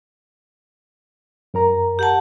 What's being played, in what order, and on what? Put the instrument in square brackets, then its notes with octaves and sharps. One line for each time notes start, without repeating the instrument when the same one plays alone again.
[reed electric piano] F#2 A#4 A#5
[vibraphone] G4 F#5 A5